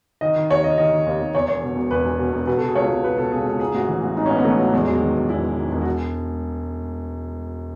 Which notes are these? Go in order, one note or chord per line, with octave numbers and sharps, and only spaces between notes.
D#3 D#5
D#3
D#2 C#5
D#2 D#5
D#3 D#5
D#3
D#2
D#2
E2 C#5
E1 C#5
B2
E1
E2 B4
E1
B2
E1
B2 B4
A4
B2
G#4
C#2 C#5
C#2
B2 B4
B2 A4
C#2 G#4
C#2
G#2 G#4
A1 F#4
E3
A1
G#2 D#4
C#4
A1
B3
E3 A3
A1 F#3
E2 G#3
E1 F#3
G#3
D#3
E1
E2 E4
E1
D#3
E1
F#4